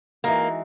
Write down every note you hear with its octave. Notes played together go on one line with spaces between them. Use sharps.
E3 G#3 A#3 D#4 F#4